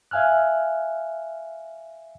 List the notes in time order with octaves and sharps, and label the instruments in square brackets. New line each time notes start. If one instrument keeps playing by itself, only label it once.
[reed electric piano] E5 F5 G#5 F6 F#6